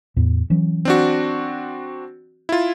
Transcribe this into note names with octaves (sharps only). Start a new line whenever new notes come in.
E2 A2
E3 F#3 C#4
C4 D4 F#4
E4 F4